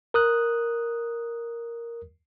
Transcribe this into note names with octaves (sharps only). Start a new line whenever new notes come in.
A#4 D#6 F#6